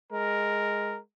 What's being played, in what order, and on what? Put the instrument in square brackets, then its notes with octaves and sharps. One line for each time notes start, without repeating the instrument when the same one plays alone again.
[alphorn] G#3 [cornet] A#4